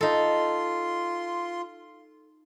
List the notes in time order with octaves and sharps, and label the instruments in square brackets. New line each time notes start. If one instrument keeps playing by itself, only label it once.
[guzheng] D#4 A4 [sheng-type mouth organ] F4 C6